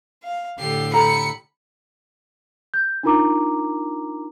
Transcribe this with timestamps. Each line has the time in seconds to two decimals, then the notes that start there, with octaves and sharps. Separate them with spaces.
0.23 F5
0.59 A2 D3 G4 C7
0.93 G4 A4 A#5 B5 C#7
2.74 G6
3.03 D4 D#4 F4 A#4 A#5 D6